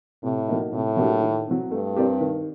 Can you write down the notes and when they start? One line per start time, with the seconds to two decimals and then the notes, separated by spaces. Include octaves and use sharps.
0.23 A2 C3
0.47 F#3 A#3 D#4
0.73 A2 C3
0.97 F#3 A#3 D4 G4
1.22 D#3
1.47 F#3 C4
1.71 G2 A3
1.96 C4 G4 A#4 D5
2.21 D#3